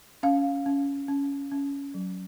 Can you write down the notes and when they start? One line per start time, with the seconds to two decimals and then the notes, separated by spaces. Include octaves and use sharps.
0.23 C#4 F5
0.66 C#4
1.08 C#4
1.51 C#4
1.94 F#3